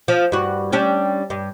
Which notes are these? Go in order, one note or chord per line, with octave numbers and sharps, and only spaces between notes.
F3
G2 F#4
G3 C#4 D4
G2